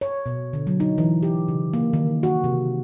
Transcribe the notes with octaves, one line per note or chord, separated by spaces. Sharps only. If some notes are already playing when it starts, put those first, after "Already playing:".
C#5
B2
D3
F#3
D#4
E3
G4
C#3
A#3
D#3
F#4
C3